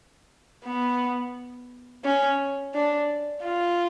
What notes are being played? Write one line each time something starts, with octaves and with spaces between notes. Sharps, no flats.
B3
C#4
D4
F4